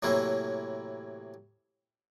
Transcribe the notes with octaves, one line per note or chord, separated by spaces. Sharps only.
A2 C3 E3 F#3 A#3 E4